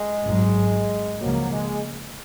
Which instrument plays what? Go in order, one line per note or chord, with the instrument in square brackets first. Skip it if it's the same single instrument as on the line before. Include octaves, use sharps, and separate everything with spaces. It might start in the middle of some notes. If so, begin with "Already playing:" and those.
Already playing: [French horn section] G#3
[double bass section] G#1 G#2 F#3
[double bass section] C#2 C#3 F3 A#3 [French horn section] F#3
[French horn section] G#3